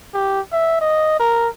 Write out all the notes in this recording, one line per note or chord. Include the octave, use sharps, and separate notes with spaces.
G4
E5
D#5
A#4